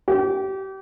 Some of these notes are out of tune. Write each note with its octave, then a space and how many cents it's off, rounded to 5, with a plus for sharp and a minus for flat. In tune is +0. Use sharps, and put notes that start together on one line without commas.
G4 -30